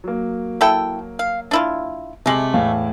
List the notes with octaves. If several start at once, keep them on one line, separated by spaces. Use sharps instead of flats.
F#3 A#3
E4 A4 G5
F5
D4 E4 F4
C3 G#3 A3 D6 F#7
E2 A2 F5